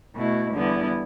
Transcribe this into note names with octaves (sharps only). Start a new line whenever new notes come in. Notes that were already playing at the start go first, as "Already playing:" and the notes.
B2 A3 E4
E2 D3 G3 B3 E4